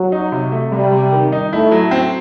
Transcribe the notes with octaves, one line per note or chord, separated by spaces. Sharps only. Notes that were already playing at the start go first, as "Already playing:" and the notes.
Already playing: F#3
D#4
C3
A3
C3 G3
C3
D#3
D#4
A3 E4
F#3
C4